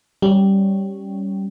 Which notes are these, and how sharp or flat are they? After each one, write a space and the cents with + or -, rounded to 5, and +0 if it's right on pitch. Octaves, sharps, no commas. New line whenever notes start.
G3 -10 C#4 +0